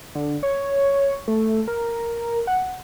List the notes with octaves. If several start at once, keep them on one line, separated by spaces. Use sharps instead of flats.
D3
C#5
A3
A#4
F#5